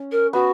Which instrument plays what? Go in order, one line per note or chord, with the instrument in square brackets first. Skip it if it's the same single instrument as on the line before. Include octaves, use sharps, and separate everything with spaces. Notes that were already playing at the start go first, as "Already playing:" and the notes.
Already playing: [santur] C#4
[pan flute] A#4
[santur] B3 [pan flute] F#4